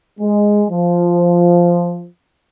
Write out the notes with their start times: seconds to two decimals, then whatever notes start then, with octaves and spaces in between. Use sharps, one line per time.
0.20 G#3
0.70 F3